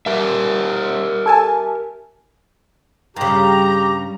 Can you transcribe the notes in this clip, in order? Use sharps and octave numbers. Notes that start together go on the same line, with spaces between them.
G4 A#4 E5
A4 G#5 A5
G2 C#3 G3 G4 A#5